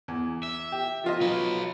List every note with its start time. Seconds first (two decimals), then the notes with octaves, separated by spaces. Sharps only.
0.08 E2
0.43 E5
0.72 G4
1.04 F3 F4 D#5
1.21 F#3 B4